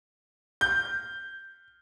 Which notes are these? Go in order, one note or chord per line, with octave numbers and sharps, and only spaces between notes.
G6